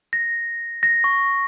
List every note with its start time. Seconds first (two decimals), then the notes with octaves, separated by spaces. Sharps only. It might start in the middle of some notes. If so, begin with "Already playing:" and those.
0.13 A#6
0.83 A#6
1.04 C#6